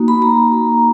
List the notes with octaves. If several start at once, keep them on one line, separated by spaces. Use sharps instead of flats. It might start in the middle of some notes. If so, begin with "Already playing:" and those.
Already playing: A#3 D#4 F#4
B5
A#5